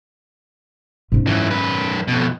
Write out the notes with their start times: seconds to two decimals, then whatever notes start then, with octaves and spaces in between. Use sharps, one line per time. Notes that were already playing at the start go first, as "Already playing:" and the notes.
1.12 G#2 C#4
1.27 F#2 E3
1.50 F#2 B4
2.08 F2 B2